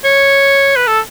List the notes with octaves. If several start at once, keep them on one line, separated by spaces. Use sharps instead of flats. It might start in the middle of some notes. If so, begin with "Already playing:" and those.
C#5
B4
A4